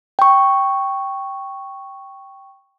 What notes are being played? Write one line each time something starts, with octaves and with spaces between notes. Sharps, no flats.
G5 C#6